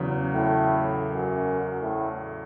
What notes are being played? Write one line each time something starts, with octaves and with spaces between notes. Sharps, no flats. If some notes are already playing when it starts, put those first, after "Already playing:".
Already playing: E2 C#3 F#3
A2
F#2
A2